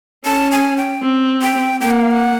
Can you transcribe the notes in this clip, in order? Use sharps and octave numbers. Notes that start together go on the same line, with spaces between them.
C#4 A5
G#5
G5
C4
G5
A#3 G5
F#5
F5
F#5